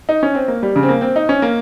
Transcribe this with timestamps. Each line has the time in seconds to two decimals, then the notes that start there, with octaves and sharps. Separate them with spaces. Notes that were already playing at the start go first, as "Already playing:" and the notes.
0.09 D#4
0.23 C#4
0.35 C4
0.48 A#3
0.63 G3
0.76 C#3
0.83 C4
0.89 A#3
1.01 C4
1.16 D#4
1.29 C#4
1.42 A#3